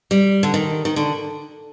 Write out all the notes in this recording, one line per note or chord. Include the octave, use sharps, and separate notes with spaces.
G3
D3
D#3
D#3
D3